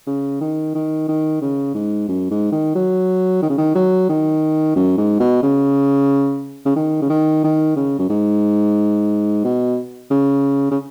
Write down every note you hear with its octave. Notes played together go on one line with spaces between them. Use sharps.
C#3
D#3
D#3
D#3
C#3
G#2
F#2
G#2
D#3
F#3
D#3
C#3
D#3
F#3
D#3
F#2
G#2
B2
C#3
C#3
D#3
C#3
D#3
D#3
C#3
F#2
G#2
B2
C#3
C#3